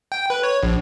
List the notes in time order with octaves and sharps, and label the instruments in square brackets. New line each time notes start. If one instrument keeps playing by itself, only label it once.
[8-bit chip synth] G5
B4
C#5
A#1